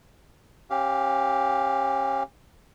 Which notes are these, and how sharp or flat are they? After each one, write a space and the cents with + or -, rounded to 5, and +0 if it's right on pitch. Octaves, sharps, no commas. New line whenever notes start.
C#4 -30 G4 -5 F5 +0